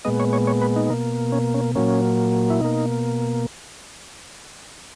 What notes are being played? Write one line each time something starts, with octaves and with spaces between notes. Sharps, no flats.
A#2 G#3 B3 D#5
C#5
C#5
C#5
B4
D#4
B2 A#3
C#4
C#4
A#2 F#3 A#3 C#4
E4
B2 A#3 D#4